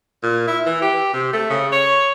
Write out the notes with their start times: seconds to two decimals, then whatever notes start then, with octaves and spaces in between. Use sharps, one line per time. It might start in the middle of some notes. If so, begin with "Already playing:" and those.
0.23 A#2
0.48 E4
0.66 E3
0.82 G4
1.14 C3
1.33 A3
1.50 C#3
1.73 C#5